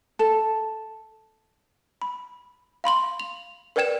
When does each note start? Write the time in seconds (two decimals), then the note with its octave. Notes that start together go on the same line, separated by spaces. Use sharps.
0.19 A4
2.02 B5
2.84 F5 B5 C6 F#7
3.20 F7
3.76 A#4 B4 D5 G5 G#6 E7